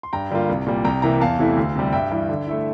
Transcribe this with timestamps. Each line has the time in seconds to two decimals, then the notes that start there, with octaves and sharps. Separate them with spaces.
0.03 C6
0.13 G2 G5 A#5
0.31 D3 G3 A#3 F4
0.49 C2
0.67 A#2 G3
0.85 C2 G5 A#5
1.02 C3 E3 A#3 G5 A#5
1.21 E2 F5 A5
1.38 C3 E3 A3 E4
1.57 D2
1.76 C3 G3
1.92 G2 E5 G5
2.12 E3 G3
2.29 D3
2.47 A3 E4